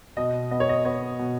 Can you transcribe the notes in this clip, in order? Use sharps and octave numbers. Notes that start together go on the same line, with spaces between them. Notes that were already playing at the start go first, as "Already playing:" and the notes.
B2 D#5
B3 D#5
C#5
D#5
B3 C#5
B2